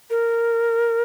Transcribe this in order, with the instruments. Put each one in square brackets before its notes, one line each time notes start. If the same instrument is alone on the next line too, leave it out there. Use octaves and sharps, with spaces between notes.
[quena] A#4